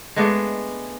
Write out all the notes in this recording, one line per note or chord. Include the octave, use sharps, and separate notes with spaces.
G#3 A3 B3 D4